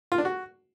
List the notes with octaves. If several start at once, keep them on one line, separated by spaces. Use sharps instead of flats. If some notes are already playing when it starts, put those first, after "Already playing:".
F4
D4
F#4